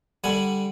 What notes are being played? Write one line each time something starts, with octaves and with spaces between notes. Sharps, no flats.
D3 G3 F#5 G#5